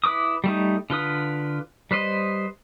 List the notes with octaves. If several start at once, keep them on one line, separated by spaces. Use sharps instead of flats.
E4 B4 D6 D#6
G3 A3 D#4
D3 F4 B4 D#6
G3 B4 C5 D#5